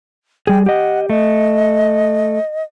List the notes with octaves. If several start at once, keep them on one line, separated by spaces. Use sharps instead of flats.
G3 G#4 G5
G4 D#5 F#5
A3 D#5